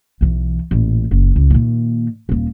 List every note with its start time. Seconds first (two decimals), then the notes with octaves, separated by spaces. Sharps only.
0.21 B1 E3
0.71 A1 A#2
1.11 F#1
1.36 C#2
1.50 A#2 D#3
2.29 D#1 A#3